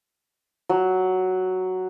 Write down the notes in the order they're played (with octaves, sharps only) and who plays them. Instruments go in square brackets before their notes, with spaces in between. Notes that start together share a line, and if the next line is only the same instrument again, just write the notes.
[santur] F#3